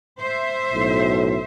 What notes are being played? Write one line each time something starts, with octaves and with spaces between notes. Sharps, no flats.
C5 E5
B1 A2